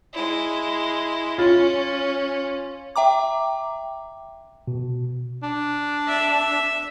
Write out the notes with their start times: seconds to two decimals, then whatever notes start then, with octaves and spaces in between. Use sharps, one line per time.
0.13 G#3 E4
1.38 C#4 F4
2.96 E5 G5 A#5 D6
4.68 B2
5.43 D4
6.08 E5